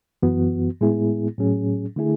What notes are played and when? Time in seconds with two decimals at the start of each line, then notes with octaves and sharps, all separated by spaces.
0.22 F#2 E3 B3 F#4
0.81 A2 G#3 B3 E4 G#4
1.38 A2 F#3 C#4 G#4
1.96 D3 A3 E4 G#4